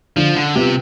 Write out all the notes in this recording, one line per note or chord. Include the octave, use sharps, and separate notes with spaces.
D3 F3
D3
C3 G3 B3 F4